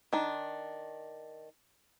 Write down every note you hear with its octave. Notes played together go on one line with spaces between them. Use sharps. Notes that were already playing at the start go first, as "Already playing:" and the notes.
D#3 D4